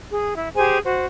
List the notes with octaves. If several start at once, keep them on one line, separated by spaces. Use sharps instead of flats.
G#4
E4
G4 G#4 C5 G#5
F#4 C5